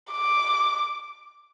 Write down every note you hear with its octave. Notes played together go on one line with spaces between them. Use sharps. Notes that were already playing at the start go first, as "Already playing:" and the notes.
D6